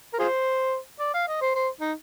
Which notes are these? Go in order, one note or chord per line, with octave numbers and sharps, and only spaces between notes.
A#4
F4 G#4 C5
D5
F5
D#5
C5
C5
D#4